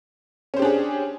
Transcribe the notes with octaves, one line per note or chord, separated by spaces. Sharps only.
C#4 D4 G4 G#4 C5